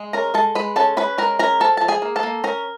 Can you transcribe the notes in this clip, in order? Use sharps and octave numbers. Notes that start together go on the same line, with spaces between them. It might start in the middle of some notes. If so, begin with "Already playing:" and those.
Already playing: G#3
C#4 A#4 A#5
G#3 A4 A5
G#3 B4 B5
C#4 A4 A5
C#4 B4 B5
G#3 A#4 A#5
C#4 A#4 A#5
F3 A4 A5
F3 A5
G#4 G#5
A#3
A4 A5
A#3
C#4 A#4 A#5